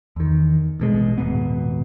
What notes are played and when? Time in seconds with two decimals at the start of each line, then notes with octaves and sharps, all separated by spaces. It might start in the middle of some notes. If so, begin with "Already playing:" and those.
0.16 E2 D#3
0.80 A1 B2 G#3
1.18 D#1 G#2 B2 B3